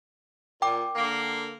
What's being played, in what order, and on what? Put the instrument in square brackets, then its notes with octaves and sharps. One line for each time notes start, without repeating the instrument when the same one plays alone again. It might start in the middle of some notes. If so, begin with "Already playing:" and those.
[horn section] A#2 [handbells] G5 D6
[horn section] D3 A#3